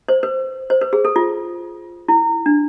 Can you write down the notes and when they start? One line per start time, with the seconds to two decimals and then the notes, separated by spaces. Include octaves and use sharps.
0.08 C5
0.23 B4
0.70 C5
0.81 B4
0.93 G#4
1.05 A4
1.16 F4
2.08 E4
2.46 D4